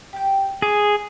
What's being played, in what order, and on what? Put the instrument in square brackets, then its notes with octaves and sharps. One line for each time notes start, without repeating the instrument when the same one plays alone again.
[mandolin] G4 G5
[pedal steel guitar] G#4 [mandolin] D6